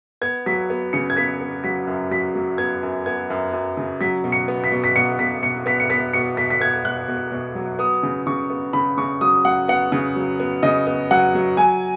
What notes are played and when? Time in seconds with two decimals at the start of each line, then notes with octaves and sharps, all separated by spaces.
0.21 B3 G#6
0.46 F#3 B6
0.70 B3
0.93 C#3 C#7
1.10 G#6
1.17 B3 B6
1.41 B3
1.64 F#3 B6
1.87 F#2
2.11 F#3 B6
2.35 F#3
2.58 B3 G#6
2.83 F#2
3.06 B3 G#6
3.30 F#2
3.53 F#2
3.77 C#3
4.01 F#3 B6
4.24 B2
4.32 C#7
4.48 B3
4.64 B6
4.72 B2
4.84 B6
4.96 B2 C#7
5.19 B2 B6
5.43 B2 C#7
5.66 B3 B6
5.80 C#7
5.90 B3 B6
6.13 B2 C#7
6.37 B2 B6
6.50 B6
6.60 B3 G#6
6.85 B2 F#6
7.08 B2
7.32 B2
7.55 F#3
7.79 B3 D#6
8.03 C#3
8.27 C#3 C#6
8.50 B3
8.73 C#3 B5
8.97 C#3 C#6
9.21 F#3 D#6
9.45 F#3 F#5
9.68 B3 F#5
9.92 C#3
10.16 F#3
10.40 B3
10.63 C#3 D#5
10.87 B3
11.11 F#3 F#5
11.35 F#3
11.57 F#3 G#5